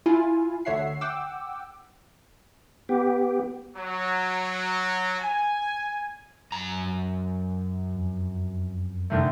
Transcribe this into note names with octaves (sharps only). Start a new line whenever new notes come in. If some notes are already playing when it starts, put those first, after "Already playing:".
E4 F4 G#5
D2 D3 C#5 E5 F#5 C7
F#5 G5 D6 E6
B3 G4
F#3
G#5
F#2 A#5
F2
D3 D#3 A3